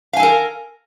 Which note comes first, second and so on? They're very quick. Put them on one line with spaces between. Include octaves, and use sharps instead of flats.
F5 G#5 A4 A#4